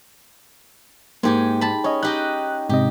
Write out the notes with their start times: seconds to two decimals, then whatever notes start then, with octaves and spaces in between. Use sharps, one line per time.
1.23 G#2 A#3 G4 G#5
1.61 A5 B5
1.84 C#4 C#5 D#5
2.03 D#4 G4 D#5 F#6
2.69 G#2 C3 G4 D#5